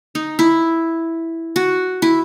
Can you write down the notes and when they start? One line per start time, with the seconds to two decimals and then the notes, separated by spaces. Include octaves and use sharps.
0.15 D#4
0.39 E4
1.56 F#4
2.02 E4